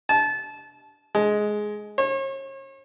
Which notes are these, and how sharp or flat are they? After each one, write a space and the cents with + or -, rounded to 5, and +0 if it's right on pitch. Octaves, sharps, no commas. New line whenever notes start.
A5 -25
G#3 +10
C#5 -40